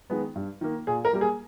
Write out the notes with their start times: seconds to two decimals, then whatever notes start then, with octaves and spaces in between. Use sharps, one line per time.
0.10 D#3 G#3 B3
0.36 G2
0.61 D#3 A#3
0.87 A#2 G#4
1.05 A#4
1.13 G3 A#3
1.21 G#4